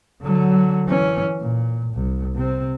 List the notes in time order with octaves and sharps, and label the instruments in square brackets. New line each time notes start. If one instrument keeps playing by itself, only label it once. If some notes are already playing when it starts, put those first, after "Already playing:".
[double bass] D3 F#3
E3 C#4
A#2
C2
C3 C4